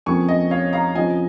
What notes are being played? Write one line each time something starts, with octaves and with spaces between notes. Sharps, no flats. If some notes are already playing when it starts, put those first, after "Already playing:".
F2 C#3 A#3 G#5 C#6
D#5
C#5 F5
F5 A#5
F2 C#3 F3 D#5 G#5